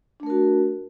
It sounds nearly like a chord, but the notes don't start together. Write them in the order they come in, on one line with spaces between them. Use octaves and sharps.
D4 A3 A#4 F#4